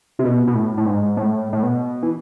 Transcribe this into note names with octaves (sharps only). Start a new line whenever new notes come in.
C3
B2
B2
A2
A2
G#2
A2
A2
B2
E3